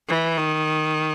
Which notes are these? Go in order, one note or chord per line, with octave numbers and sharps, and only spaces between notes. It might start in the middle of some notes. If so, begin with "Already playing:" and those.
E3
D#3